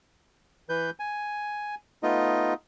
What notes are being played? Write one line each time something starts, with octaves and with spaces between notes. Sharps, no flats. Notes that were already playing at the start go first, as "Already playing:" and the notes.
E3 B4 G6
G#5
A3 B3 D#4 F4 D#5